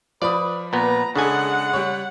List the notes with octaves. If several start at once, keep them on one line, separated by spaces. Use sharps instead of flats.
F3 B4 D5 B5 D#6
A#2 B3 B4 A#5
C#3 G#3 D4 A4 F#5 G#5
G3 C#5